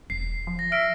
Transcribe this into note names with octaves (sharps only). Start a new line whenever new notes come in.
E1 C7
F3
A#6
E5 F6 D7